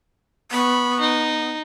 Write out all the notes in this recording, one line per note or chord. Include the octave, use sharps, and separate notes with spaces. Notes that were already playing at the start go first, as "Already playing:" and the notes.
B3 B5 C#6
D#4